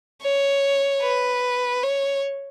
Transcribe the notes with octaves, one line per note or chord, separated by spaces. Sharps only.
C#5
B4
C#5